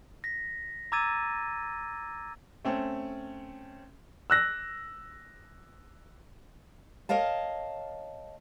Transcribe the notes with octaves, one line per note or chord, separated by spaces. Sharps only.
A#6 B6
A#5 D6 E6 G#6 A6 D#7
A3 C4 C#4
E6 F#6 A#6
A#4 C#5 D#5 F5 A5